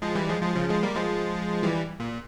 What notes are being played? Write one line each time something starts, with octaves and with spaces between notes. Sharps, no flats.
F3 G#3
E3 G3
F3 G#3
F3 G#3
C#3 F3
F3 G#3
G3 A#3
F3 G#3
E3 G3
A#2